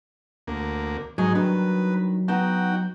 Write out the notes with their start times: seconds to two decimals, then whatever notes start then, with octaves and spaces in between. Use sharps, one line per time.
0.47 D2 A#3
1.18 G#2 F#3 D#4 G#4
1.35 D#3 G3 D4 B4
2.28 B3 D#4 F#4 G5 A5